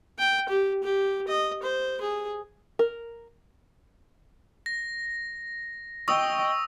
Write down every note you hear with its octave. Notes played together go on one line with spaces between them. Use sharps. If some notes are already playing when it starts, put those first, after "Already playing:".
G5
G4
G4
D#5
C5
G#4
A#4
A#6
D#5 G5 C#6 D#6 E6